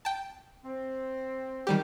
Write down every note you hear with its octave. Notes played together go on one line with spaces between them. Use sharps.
G5 A5
C4
D#3 G3 G4